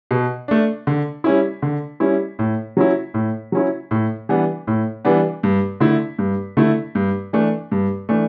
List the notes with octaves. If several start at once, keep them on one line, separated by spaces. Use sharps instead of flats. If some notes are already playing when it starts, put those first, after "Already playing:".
B2
A3 D4
D3
G3 C#4 E4
D3
G3 C#4 E4
A2
F#3 C#4 E4
A2
F#3 C#4 E4
A2
E3 G3 B3 D4
A2
E3 G3 B3 D4
G2
D3 A3 E4
G2
D3 A3 E4
G2
E3 A3 D4
G2
E3 A3 D4